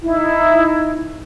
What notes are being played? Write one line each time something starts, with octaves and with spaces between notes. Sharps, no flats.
D#4 E4